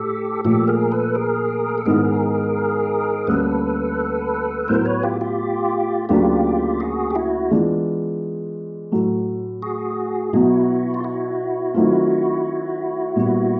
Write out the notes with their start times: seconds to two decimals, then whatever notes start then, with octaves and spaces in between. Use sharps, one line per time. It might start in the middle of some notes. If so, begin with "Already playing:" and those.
Already playing: A2 G4 A4
0.45 A#2 F3 A3 G4 A4
0.68 G#4 A#4
0.92 A4 B4
1.15 G#4 A#4
1.78 A4
1.86 G#2 D#3 G#3 B3 E4 G#4 A#4
3.27 D2 D3 G3 A#3 C#4 A4 B4
4.68 A2 F#3 B3 E4 A#4 C5
4.85 B4 C#5
5.03 F4 G4
5.21 F4 G4
6.09 D2 C#3 F#3 A#3 D4 F4 G4
6.80 F#4 G#4
7.11 G4
7.15 E4 F#4
7.50 E3 G#3 B3 D4 F4
8.92 A2 F#3 A3
9.62 F#4 G#4
10.33 B2 F#3 B3 E4 F#4
10.94 F4
11.04 E4 F#4
11.74 D#3 F#3 A3 C4 F4
13.16 A#2 G3 B3